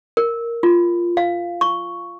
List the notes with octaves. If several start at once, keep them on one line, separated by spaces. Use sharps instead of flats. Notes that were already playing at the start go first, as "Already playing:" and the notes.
A#4
F4
F5
C#6